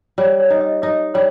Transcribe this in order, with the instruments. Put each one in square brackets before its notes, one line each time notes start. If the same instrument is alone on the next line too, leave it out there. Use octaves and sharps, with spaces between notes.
[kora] G3 [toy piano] C#5
[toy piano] C#5
[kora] D#4
[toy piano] D#5
[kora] D#4 [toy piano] D#5
[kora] G3 [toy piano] C#5